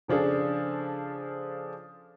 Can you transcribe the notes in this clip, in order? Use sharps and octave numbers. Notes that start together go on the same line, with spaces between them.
C#3 F3 D4 G#4 A4